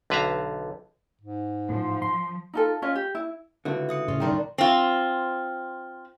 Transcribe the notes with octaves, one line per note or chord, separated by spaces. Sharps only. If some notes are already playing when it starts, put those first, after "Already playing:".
B1 D3 B4 E5 F5 A#5
G#2
A2 F3
C6
D#4 F4 A4
C#4 F4 C#5 D#5
G4
E4
C#2 A2 D3 A3 F#4 B4 E5
E5 D#6 C#7
A2 C#3 C#4 F4
C2 D#3 G3 B3 D4 G5 A#5 C6
C4 F4